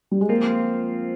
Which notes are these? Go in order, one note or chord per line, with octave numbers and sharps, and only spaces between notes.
G3
G#3
F3 A#3 C4 F4